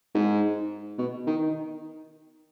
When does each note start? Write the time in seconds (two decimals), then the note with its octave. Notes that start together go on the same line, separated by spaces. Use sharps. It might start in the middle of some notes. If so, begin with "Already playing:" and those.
0.15 G#2
0.98 B2
1.27 D#3